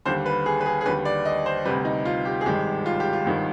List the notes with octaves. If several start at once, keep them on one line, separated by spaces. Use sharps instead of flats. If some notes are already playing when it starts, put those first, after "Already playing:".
D#2 D3 G3 C5
B4
G#4
B4
G#4
G#4
D#2 D3 G3 B4
D5
D#5
C5
D2 C3 G3 B4
D#4
F4
G4
G#4
G#1 G2 D#3 G#3 G4
F4
G4
F4
G#1 G2 D#3